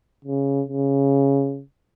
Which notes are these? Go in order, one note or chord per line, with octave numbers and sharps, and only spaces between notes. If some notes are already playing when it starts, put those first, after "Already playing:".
C#3
C#3